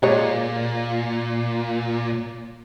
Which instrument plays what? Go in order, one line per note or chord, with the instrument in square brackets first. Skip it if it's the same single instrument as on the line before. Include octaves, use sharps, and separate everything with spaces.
[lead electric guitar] A#2 [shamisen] G#3 C#5